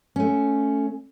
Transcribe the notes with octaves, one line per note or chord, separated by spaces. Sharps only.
A3 C#4